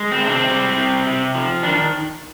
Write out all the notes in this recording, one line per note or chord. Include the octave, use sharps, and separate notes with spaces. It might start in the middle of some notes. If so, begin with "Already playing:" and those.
Already playing: G#3
C4
C3 D4
C4
G3
C3
C3
F3
D#3 D4